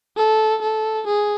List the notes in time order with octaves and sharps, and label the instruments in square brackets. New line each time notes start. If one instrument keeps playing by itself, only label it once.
[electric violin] A4
A4
G#4